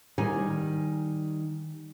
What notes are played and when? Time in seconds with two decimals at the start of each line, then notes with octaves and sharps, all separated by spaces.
0.18 D#3 G3 G#5